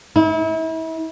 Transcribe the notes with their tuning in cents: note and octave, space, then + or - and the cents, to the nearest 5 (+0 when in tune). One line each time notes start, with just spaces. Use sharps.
E4 -35